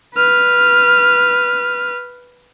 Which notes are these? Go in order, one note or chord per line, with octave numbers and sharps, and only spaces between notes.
B4 F6